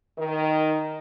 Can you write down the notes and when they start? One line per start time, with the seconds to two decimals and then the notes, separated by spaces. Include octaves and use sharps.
0.18 D#3